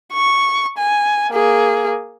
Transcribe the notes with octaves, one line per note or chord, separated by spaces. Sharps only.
C#6
G#5
A#3 G#4